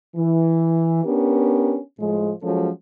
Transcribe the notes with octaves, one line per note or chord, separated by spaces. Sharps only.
E3
B3 C#4 D4 G4 A#4
A2 F3 G#3
F3 F#3 G#3 C#4 A4